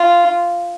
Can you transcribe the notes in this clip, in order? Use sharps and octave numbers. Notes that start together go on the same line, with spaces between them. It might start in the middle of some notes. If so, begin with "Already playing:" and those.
Already playing: F4